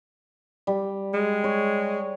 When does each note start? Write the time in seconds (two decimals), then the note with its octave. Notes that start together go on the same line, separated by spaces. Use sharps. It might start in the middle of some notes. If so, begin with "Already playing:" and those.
0.67 G3
1.13 G#3
1.44 C#5